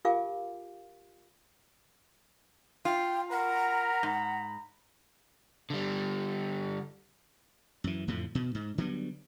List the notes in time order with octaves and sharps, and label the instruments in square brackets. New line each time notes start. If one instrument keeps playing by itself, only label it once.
[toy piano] F4 G4 A#4 F5 G#5 D6
[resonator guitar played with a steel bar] F4 [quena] G5
[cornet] A#4 [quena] F#5 [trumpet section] A#5 B5
[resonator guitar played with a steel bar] G#2
[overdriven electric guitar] D3 G3
[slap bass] F#2 E3
F2 A2 D3 F3
B2
G#2
D3 F#3 G3 B3